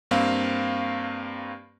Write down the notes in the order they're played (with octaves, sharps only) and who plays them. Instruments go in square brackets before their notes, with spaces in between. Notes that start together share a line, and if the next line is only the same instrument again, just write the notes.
[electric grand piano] G2 A#3 C4 F5